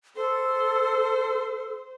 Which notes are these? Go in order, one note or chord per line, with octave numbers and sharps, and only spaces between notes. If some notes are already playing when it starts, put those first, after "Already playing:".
A4 C5